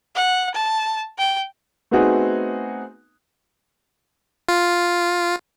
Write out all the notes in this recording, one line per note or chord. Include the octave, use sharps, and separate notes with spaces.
F#5
A5
G5
A3 B3 C4 D#4 F#4 G#4
F4